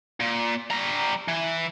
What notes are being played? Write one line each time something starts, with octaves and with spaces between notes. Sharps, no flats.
A#2
G3 A#5
E3